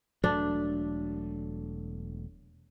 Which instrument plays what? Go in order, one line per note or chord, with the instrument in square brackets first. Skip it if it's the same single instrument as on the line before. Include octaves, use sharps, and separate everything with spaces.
[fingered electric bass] E1 F#3 A3 [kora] D4